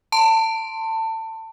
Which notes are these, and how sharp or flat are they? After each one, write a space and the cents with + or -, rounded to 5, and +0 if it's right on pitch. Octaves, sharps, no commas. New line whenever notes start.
A5 +25 C6 +0